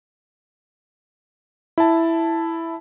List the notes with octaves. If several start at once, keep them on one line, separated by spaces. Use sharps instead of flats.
E4 A5